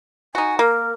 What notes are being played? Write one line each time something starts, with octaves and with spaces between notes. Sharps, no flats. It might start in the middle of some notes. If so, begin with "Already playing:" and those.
D#4 F#4 G#5
A#3 A#4